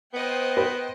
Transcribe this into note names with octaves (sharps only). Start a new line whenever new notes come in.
B3 C5 D#5 G5
B4